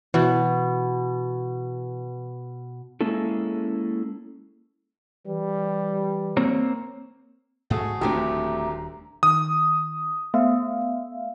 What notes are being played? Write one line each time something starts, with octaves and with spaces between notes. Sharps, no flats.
B2 E3
G#3 A#3 C#4 E4 A4
E3 G3
A#3 C4 C#5
G#2 A3 F#4 G#4
D#1 D2 A2 C3 A3 D4 G4 A#5
D#3 D#6
A3 B3 E5 F5